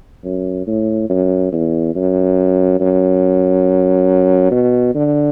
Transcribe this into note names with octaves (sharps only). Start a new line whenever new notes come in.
F#2
A2
F#2
E2
F#2
F#2
B2
D3